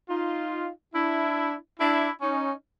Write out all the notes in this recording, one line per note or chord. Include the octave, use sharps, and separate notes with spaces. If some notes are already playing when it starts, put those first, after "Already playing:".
D#4 F4
D4 E4
D4 E4
C#4 D#4